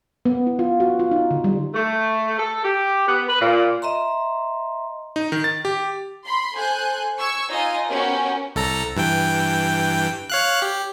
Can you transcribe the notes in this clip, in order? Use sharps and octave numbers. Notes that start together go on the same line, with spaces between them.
B3
E4
F4
F#4
F4
D#4
D3
G3
A3
A4
G4
B3
B4
A#2
D#5 E5 A#5 C6
D#4
D#3
A6
G4
B5 C6
A4 C5 G#5 F#6 G6
C#6 E6 G#6
D#4 F4 D#5 G#5
B3 C#4 F#4 G4 A#4
C2 A4 A#5
G2 E3 G5
C#5 F5 F#6
G4